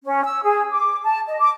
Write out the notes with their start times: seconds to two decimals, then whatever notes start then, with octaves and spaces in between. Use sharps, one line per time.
0.04 C#4
0.24 E6
0.43 G#4
0.71 D6
1.04 A5
1.28 D#5
1.39 D6